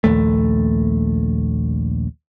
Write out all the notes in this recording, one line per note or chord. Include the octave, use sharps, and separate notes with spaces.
A#1 D#2 A3